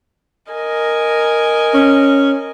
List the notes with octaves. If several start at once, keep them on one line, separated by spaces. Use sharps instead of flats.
A#4 D#5 G#5
C#4